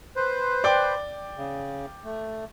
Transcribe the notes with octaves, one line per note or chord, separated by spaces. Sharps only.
B4 C5
D5 G5 D6
C#3
A3